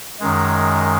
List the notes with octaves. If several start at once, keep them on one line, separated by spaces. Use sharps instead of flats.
F#2 D#3 G#3